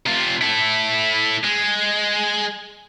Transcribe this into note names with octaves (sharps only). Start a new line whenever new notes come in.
C3 F4
E4 A4
G#3